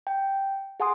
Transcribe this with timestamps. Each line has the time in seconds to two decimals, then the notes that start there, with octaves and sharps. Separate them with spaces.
0.07 G5
0.80 G#4 F#5 G#5 C6 D#6